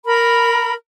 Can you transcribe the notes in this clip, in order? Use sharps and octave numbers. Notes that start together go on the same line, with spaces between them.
A#4 B5